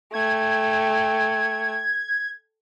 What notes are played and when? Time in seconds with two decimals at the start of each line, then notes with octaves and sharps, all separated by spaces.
0.14 A3 G5 G#6